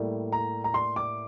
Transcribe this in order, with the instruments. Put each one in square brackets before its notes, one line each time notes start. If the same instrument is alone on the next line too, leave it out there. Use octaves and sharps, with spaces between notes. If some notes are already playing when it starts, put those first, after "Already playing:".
Already playing: [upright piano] A2 G3 A#3
A#5
A#5
C6
D6